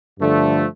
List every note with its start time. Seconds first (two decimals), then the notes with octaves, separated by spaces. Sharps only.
0.19 G2 D3 F3 A3